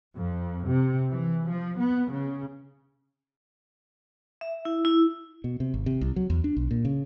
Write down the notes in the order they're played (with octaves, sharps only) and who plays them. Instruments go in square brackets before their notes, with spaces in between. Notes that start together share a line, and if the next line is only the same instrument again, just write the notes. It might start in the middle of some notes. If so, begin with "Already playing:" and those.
[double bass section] F2
C3
E3
F3
B3
C#3
[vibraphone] E5
E4
E4
[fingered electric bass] B2
C3
G#1
C3
C2
F#3
E2
D4
B1
A#2
C#3